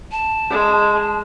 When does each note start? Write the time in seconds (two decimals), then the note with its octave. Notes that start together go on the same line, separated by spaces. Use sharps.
0.12 A5
0.50 G#3